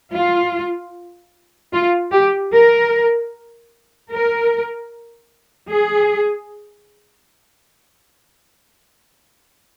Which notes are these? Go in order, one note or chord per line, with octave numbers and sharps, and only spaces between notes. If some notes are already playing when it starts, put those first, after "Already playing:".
F4
F4
G4
A#4
A#4
G#4